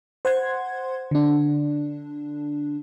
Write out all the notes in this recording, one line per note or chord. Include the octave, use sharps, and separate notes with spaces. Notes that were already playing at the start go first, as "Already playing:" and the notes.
C5 F#5 C6 G#6
D3 D4